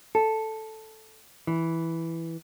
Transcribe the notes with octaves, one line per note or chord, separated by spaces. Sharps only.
A4
E3